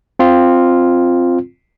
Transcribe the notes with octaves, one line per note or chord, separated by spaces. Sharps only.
C4 F4